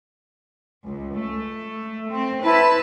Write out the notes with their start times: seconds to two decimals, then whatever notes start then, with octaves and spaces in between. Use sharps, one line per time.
0.85 C#2
1.18 A3
2.09 C4
2.43 E4 B4 A5